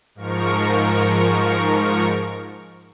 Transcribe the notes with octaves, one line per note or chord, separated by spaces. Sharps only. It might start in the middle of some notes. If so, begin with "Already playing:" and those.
G#2 F3 A#4 C#6